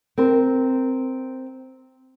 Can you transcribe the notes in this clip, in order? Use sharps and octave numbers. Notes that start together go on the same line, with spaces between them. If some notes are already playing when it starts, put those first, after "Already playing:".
C4 A#4 C5